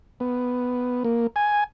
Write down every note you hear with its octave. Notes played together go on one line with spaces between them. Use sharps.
B3
A#3
G#5